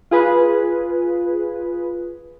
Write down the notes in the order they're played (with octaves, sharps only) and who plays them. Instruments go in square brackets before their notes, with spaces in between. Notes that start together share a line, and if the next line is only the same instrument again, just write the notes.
[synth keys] F4 G#4 B4